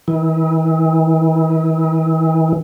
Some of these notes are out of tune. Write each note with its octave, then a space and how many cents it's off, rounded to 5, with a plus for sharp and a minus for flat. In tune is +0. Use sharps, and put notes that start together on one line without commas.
E3 -40